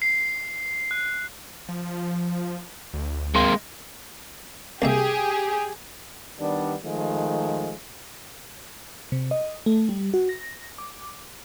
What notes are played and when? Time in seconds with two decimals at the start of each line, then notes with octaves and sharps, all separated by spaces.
0.02 C7
0.91 F#6
1.69 F3
2.94 D2
3.35 G#3 A#3 C4 C6
4.82 C2 A#3 G4 G#4 E5
6.39 D#3 G3 B3 D4
6.84 D#3 F3 G#3 A3
9.12 C3
9.31 D#5
9.66 A3
9.89 G3
10.14 F#4
10.29 A#6
10.78 D6